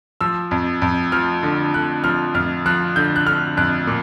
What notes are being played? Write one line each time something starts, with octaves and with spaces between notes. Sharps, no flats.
F3 E6
F2
F2
F3 F6
D3
D3 F#6
F3 F6
F2 F6
F3 F#6
D3 G6
F#6
D3 F6
F2 F#6
A#2